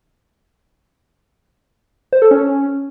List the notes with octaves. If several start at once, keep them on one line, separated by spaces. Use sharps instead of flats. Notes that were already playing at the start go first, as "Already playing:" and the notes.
C5
A4
C#4